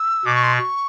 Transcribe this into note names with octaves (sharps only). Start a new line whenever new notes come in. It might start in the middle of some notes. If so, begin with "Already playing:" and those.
Already playing: E6
B2 D6
C#6
C6
C#6